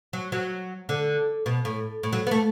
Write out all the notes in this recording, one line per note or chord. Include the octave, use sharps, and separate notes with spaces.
F#3
F#3
D3
B2
A2
A2
F#3
B3
A3